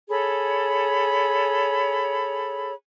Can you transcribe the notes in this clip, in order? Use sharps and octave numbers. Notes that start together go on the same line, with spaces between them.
G#4 A4 C#5 B5